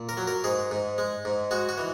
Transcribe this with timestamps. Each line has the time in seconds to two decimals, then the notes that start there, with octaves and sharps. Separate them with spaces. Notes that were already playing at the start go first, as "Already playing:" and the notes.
Already playing: A#2
0.09 A#4
0.17 F#3
0.27 A#4
0.44 G#2 G#4
0.71 G#2
0.98 G#3
1.25 G#2
1.51 G#3 F#4
1.69 F#4
1.78 E3